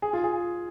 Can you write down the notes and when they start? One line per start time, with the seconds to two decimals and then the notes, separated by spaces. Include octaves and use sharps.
0.02 G#4
0.13 F4
0.24 G#4